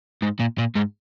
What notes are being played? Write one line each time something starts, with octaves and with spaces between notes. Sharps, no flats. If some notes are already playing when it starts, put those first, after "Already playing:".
G#2
A#2
A#2
G#2